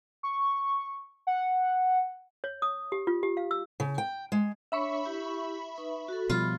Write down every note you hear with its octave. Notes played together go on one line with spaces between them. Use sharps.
C#6
F#5
C#5
D#6
G4
F4
G4
F5
E6
C#3
G5
G#3
D4 C#5 E5 B5 C#6
E4 G4
D#4 B4
F#4 A4
B2 F3 G3 F4 B5